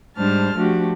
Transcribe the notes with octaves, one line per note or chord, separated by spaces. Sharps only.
G#2 G3 D4 C5 A5 F6
F3 A3 D4 F#4 G4